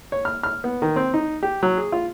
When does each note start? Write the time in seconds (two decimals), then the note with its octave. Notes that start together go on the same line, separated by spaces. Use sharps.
0.12 C#5
0.25 F6
0.43 F6
0.64 B3
0.82 D#3
0.96 C4
1.14 D#4
1.43 G4
1.63 F#3
1.77 G#4
1.92 F4